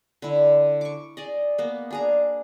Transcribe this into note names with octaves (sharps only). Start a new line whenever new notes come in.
D3 E4
C#6 D6
G#4 D5 D#5
A#3 B3
D4 G#4 A#5